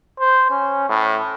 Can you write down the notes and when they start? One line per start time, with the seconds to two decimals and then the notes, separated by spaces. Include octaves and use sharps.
0.19 C5
0.51 C#4
0.89 A2